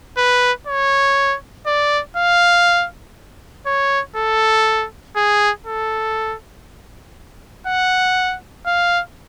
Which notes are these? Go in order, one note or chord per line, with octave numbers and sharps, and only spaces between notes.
B4
C#5
D5
F5
C#5
A4
G#4
A4
F#5
F5